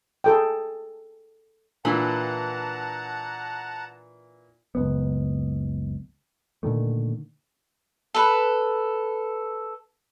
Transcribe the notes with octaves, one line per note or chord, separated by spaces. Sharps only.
G#4 A4 G5
A#2 E3 D4 F#5 A5 A#5
F#1 C#2 B3
A#2 D3 D#3 A3
A4 B4